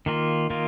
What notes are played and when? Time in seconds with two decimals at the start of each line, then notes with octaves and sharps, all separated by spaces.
0.06 D#3 A#3 F4
0.50 D#3 A#3 F4